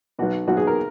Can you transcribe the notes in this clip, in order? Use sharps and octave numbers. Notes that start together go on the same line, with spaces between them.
B1 B2 F#4
B1 B2 F#4
G#4
A#4